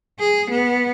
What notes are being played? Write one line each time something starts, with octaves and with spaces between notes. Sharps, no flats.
G#4
B3